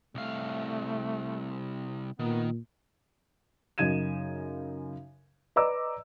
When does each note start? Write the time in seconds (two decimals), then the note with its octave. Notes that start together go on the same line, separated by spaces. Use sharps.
0.15 C2 A3 F5
2.19 A#2 D#3 B3
3.78 F#2 C#3 D#4 G#6 D#7 E7
5.56 B4 D5 D#5 A#5 D6 E6